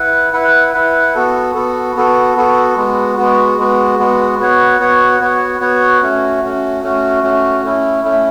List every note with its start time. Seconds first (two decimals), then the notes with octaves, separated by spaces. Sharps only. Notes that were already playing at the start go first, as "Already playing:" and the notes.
Already playing: E4 B4 F#5
0.33 E4 B4 F#5
0.74 E4 B4 F#5
1.15 B3 F#4 A4
1.54 B3 F#4 A4
1.96 B3 F#4 A4
2.36 B3 F#4 A4
2.76 G#3 B3 F#4
3.17 G#3 B3 F#4
3.58 G#3 B3 F#4
3.99 G#3 B3 F#4
4.39 B3 F#4 C#5 F#5
4.80 B3 F#4 C#5 F#5
5.20 B3 F#4 C#5 F#5
5.60 B3 F#4 C#5 F#5
6.02 A3 C#4 F#4
6.42 A3 C#4 F#4
6.82 A3 C#4 F#4
7.23 A3 C#4 F#4
7.63 A3 C#4 E4
8.04 A3 C#4 E4